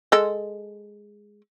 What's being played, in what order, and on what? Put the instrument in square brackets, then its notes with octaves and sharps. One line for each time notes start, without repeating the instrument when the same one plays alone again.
[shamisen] G#3 A4